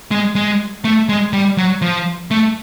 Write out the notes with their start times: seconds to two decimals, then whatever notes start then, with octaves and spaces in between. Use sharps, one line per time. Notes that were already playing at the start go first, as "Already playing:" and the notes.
0.11 G#3
0.35 G#3
0.84 A3
1.09 G#3
1.33 G3
1.57 F#3
1.82 F3
2.31 A3